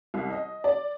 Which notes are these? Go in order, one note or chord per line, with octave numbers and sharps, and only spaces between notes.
C2
D#5
D5